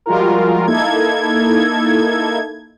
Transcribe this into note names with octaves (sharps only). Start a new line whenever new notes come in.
F3 G3 G#3 F4 F#4 A#4
A#3 D#4 E4 A4 G#6